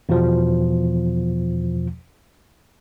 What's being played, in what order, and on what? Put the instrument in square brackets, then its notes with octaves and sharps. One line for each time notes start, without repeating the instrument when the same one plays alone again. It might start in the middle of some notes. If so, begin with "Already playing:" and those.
[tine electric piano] E2 B2 F3